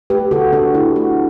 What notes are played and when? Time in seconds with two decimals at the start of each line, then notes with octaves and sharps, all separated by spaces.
0.10 A3 G4 B4
0.31 D3 F#4 A4
0.53 D3 D4 F#4
0.74 D3 E4 G4
0.96 A3 D4 F#4